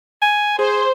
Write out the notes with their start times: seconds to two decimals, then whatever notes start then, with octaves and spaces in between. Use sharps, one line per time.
0.22 G#5
0.59 G#4 C5